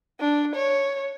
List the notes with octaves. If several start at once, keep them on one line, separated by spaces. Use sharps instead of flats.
D4
C#5